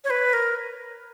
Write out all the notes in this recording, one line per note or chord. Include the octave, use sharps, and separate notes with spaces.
C#5
B4
A#4